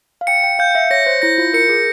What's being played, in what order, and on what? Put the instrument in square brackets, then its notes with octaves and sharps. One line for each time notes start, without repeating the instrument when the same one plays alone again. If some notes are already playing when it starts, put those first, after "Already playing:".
[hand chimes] F5
[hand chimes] G5 [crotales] C#7
[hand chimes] G5
[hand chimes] F5 [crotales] G6
[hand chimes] E5
[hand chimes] C#5 [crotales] A#6
[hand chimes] C5
[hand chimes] E4 [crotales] A#6
[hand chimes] F4
[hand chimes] A#4 [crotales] C#7
[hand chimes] G#4